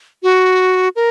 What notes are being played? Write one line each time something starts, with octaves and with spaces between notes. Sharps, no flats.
F#4
A#4